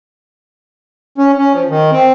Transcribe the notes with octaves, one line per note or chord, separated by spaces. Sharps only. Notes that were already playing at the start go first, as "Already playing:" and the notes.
C#4
C#4
F3
D#3
C4